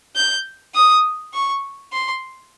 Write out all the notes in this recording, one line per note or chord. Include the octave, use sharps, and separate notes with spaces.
G6
D#6
C#6
C6